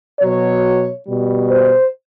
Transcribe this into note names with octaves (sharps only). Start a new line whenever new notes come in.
B2 F#3 C#5
B2 G3
C5